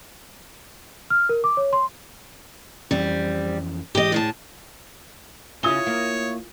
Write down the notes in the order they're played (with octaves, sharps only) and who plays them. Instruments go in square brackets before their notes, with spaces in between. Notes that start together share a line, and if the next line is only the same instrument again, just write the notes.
[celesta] F6
A#4
D6
C#5
C6
[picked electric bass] F2 E3 C#4 [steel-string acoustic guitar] G3 C4
[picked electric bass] G#2 E3 G#3 [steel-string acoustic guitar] G4 D#5
[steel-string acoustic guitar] A2 G#4 A5
[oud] C#3 C#4 [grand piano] E4 F4 [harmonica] C#5 [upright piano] D#6 G7
[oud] A#3